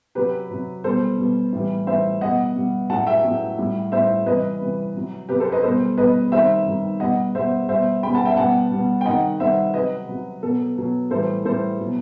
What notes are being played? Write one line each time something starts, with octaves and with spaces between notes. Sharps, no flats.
C3 F#3 G4 B4
C3 F#3
B2 G3 A4 C5
B2 G3
A2 E3 G3
A2 E3 G3 C5 E5
B2 G3 D#5 F#5
B2 G3
A2 F#3 F#5 A5
E5 G5
A2 F#3
A2 G3
A2 G3 C5 E5
C3 E3 G3 B4 D#5
C3 E3 G3
C3 F#3
C3 F#3 G4 B4
A4 C5
B4 D#5
B2 G3 A4 C5
B2 G3 B4 D#5
C3 D#3 G3 C5 E5
C3 D#3 G3
B2 G3 D#5 F#5
B2 G3 C5 E5
B2 G3 C5 E5
B2 G3 G5 B5
F#5 A5
E5 G5
B2 G3 F#5 A5
B2 G3
G5
C3 D#3 G3 D#5 F#5
C3 D#3 G3 C5 E5
C3 F#3 B4 D#5
C3 F#3
B2 F#3 A4
B2 F#3
A2 E3 G3 A4 C5
A2 E3 G3 A4 C5
B2 F#3